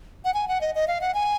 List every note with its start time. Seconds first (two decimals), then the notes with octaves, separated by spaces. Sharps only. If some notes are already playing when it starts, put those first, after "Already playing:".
0.25 F#5
0.34 G#5
0.48 F#5
0.61 D#5
0.75 D#5
0.88 F5
1.01 F#5
1.14 G#5